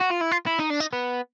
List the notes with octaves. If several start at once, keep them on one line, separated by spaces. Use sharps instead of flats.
F#4
F4
E4
F4
E4
D#4
D4
D#4
B3